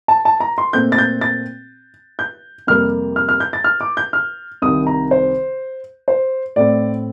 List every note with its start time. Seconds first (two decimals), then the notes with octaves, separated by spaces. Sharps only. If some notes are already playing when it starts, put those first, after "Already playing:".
0.08 A5
0.25 A5
0.40 A#5
0.58 C6
0.73 A#2 A3 C4 G6
0.92 A6
0.98 G6
1.21 A6
2.19 G6
2.67 F2 C3 G3 A#3 F6
3.16 F6
3.29 F6
3.40 G6
3.53 A6
3.64 F6
3.81 D6
3.97 G6
4.13 F6
4.62 C2 C3 D#3 D#6
4.87 A#5
5.11 C5
6.08 C5
6.56 A2 A3 C4 D5